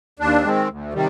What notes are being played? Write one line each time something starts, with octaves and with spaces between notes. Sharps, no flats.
D#2 D4
D#3 G#3 C4
D2
C3 D#3 G3